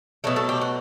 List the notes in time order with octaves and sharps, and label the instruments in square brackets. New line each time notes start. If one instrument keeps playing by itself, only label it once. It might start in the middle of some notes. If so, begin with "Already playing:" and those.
[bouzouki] B2 F#3 A3 A4
A4
G4
F#4